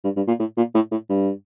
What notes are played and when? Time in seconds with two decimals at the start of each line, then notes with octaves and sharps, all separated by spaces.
0.04 G2
0.16 G2
0.28 A#2
0.39 A2
0.57 A#2
0.75 A2
0.91 A2
1.09 G2